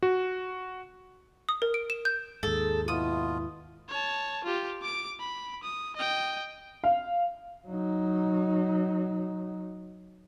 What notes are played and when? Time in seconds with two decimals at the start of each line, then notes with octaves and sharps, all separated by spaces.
0.03 F#4
1.49 D#6
1.62 A#4
1.74 D7
1.90 E7
2.05 G6
2.43 D#2 G#2 G#4 A4
2.88 B2 E4 F4 D#6
3.89 C#5 A5
4.44 F4 G4
4.81 D6 D7
5.20 B5
5.63 D#6
5.96 D#5 G5
6.84 F5
7.68 F#3 D#4